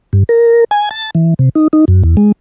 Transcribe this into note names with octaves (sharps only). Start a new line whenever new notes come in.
G2
A#4
G#5
A5
E3
C3
D#4
D#4
F#2
E2
G#3